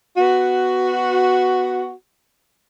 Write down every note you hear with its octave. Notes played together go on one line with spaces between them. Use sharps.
B3 F#4